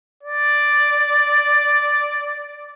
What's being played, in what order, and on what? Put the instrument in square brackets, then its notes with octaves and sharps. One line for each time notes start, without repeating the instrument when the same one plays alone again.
[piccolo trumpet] D5